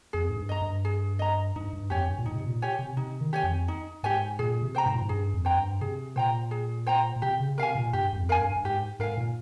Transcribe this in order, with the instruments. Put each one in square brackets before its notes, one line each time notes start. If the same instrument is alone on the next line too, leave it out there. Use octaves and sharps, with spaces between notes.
[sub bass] F2 [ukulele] G#4
[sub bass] G#2
G2
[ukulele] D#5 A#5
[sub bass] G2
[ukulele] G#4
D#5 A#5
[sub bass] G2 [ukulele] D#4
[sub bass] G2
[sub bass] F2 [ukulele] G4 C#5 G#5
[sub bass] G2
A#2
[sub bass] G#2 [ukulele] D#4
[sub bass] C3
A#2
[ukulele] G4 C#5 G#5
[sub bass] C3
[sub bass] C3 [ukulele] D#4
[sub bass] D#3
[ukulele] G4 C#5 G#5
[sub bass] F2
[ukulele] D#4
[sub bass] G#2 [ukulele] G4 C#5 G#5
[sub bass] A#2 [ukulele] G#4
[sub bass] C3
[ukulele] C5 G5 A#5
[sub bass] G#2
A#2
G#2
[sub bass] G2 [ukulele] G#4
[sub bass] F2
[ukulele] C5 G5 A#5
[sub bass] G2
[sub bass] C3 [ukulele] G#4
[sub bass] A#2 [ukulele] C5 G5 A#5
[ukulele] G#4
C5 G5 A#5
[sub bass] A#2
[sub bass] C3 [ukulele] G4
[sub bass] C#3
[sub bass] C3 [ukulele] A#4 F5 G#5
[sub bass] A#2
[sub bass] G2 [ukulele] G4
[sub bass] G2
F2
[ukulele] A#4 F5 G#5
[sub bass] G2
G2
[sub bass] G#2 [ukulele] G4
[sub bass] G#2 [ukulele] A#4 F5 G#5
[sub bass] A#2